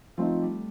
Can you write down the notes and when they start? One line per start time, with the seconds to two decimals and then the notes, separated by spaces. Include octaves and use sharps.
0.17 F3 A3 C4 D#4
0.42 G3